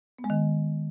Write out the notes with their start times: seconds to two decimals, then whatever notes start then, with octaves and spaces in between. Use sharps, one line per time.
0.19 B3
0.24 G#3
0.30 D#3